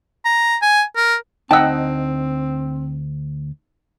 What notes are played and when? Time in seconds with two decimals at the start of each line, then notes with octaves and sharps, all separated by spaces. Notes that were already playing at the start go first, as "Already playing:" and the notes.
0.25 A#5
0.62 G#5
0.96 A#4
1.51 D2 C4 D#4 D#5 F#5 G5 A5 E6